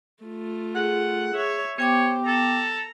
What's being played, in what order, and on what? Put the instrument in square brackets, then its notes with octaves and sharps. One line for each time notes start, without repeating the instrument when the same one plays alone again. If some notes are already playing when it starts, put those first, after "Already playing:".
[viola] A3 F4
[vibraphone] G#4 [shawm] F#5
[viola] C#5 E5
[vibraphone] B3 G5 D6 [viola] G4 C5 [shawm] C#5
[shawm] A4 [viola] A#5